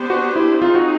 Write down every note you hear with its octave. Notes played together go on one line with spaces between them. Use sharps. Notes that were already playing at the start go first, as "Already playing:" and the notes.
Already playing: B3 D4 G4 C5
F#4
E4
C4 D#4 F4 G#4
F#4